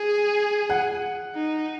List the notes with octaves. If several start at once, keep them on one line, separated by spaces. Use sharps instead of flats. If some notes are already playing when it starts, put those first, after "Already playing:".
Already playing: G#4
F#5
D#4